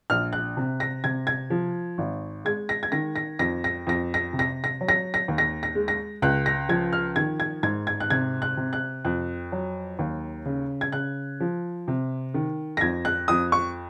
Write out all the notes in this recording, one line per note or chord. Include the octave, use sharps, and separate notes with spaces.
A#1 F6
F#6
C3
A#6
C3 G#6
G#6
F3
G#1
G#3 G#6
A#6
G#6
D#3 A#6
A#6
F2 A#6
A#6
F2 A#6
A#6
C3
A#6
A#6
F#3
A#6
A#6
D#2
A#6
A#6
G#3
A#6
C#2 F#6
A#6
F3 G#6
F6
D#3 G#6
G#6
G#2 G#6
G#6
F#6
C3 G#6
F#6
C3
F#6
F2 F#6
F#3
D#2
C#3
G#6
C#3 F#6
F3
C3
D#3
A#6
F2 G#6
F#6
F2 D#6
C#6